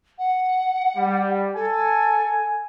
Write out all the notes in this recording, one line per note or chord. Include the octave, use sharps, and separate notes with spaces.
F#5
G3
A4 G#5